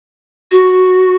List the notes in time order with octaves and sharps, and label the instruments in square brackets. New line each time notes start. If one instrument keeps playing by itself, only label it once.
[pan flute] F#4